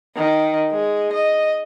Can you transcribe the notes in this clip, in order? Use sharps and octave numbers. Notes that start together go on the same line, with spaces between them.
D#3
G#3
D#5